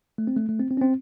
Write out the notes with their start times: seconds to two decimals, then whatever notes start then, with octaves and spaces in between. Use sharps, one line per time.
0.18 A3
0.27 C4
0.36 A3
0.49 A3
0.60 C4
0.71 C4
0.77 C#4
0.81 C4